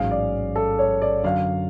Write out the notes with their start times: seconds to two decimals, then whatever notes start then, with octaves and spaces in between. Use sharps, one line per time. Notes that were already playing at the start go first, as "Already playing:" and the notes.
Already playing: A1 G#2 F#3 C#4 G#4 F5
0.11 D5
0.56 A4
0.79 C#5
1.02 D5
1.24 F#2 D3 F#3 F5